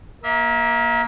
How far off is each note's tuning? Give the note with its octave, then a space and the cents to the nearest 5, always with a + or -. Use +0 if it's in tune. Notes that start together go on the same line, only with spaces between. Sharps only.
A#3 +15 E5 -30